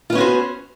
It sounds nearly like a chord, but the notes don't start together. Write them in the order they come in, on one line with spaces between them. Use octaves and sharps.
F4 B3 C#4 F#4 C5